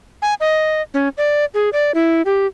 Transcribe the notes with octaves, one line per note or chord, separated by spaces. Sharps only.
G#5
D#5
C#4
D5
G#4
D5
E4
G4